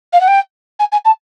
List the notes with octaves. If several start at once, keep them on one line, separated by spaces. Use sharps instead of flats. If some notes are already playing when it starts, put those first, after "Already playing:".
F5
F#5
G5
G#5
G#5
A5